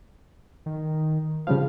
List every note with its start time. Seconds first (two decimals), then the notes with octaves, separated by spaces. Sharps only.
0.66 D#3
1.47 C#3 F3 G3 F5